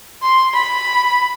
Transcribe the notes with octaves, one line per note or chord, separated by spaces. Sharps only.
C6
B5